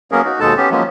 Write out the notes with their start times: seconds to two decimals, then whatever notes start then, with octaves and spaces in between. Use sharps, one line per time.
0.12 F#3 A#3 B3 C#4 G#4 A#4
0.24 D#4 F#4
0.40 D#2 B2 G#3 D#4 A4 A5
0.57 B3 C#4 G4
0.71 F3 F#3 G#3 A#3 B3 C#4